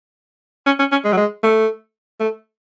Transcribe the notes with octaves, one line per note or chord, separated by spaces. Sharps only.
C#4
C#4
C#4
G#3
F#3
G#3
A3
A3